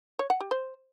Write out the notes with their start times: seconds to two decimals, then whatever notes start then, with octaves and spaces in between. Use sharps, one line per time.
0.19 C#5
0.30 F#5
0.40 G4
0.51 C5